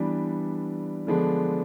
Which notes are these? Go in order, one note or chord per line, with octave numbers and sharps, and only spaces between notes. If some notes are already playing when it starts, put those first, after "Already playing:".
Already playing: E3 G3 B3 D4
D3 F3 G#3 B3 D4